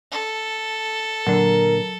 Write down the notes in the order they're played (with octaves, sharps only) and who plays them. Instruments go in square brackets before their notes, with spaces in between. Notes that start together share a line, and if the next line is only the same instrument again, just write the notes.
[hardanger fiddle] A4
[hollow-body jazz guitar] A#2 D3 D4 [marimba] F#3 [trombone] A#4